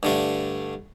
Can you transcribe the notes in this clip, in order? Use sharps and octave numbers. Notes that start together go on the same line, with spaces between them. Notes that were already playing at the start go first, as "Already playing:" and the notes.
G2 D3 A3